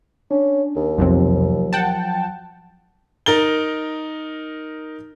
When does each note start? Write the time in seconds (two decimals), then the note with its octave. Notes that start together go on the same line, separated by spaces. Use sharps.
0.31 C#4 D4
0.76 D#2
0.98 B1 F2 C3 F3 F#3
1.73 F#5 G5 A5
3.26 D#4 A#4 A6 G7